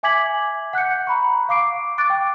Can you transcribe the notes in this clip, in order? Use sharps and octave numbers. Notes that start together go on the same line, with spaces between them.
E5 G#5 D6 G#6 B6 F#7
F#5 F#6 G6 C#7
A#5 B5 C#6
F5 C#6 D6 C7 D7
C#6 D6 F#6 A6 D7
G5